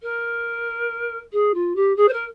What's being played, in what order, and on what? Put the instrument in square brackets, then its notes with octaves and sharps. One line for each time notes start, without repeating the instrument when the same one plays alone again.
[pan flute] A#4
G#4
F4
G4
G#4
C5
A#4